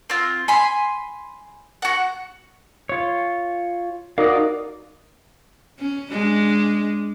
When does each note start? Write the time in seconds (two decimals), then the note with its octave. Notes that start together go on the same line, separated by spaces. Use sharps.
0.10 C4 F4
0.48 G#5 B5 C6
1.82 F#4 F#5
2.89 F4 C#5
4.18 D#4 F#4 A#4 D5 F5 A#5 D#6
5.79 C#4
6.11 G#3 D4